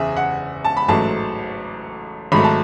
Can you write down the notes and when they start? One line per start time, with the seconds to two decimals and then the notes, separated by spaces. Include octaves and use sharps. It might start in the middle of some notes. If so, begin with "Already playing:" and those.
Already playing: F#1 E2 C#3 G#4 E5
0.17 F#5
0.65 A5
0.77 B5
0.88 A1 G#2 F#3 A3 A5
2.32 G#1 G#2 F#3 A3 B5
2.44 A5